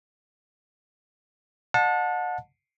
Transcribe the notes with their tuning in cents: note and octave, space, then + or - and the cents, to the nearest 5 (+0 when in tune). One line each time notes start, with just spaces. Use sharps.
D#5 -40 F#5 -35 A5 +0